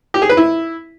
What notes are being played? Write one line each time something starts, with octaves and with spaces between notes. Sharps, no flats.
G4
G#4
B4
E4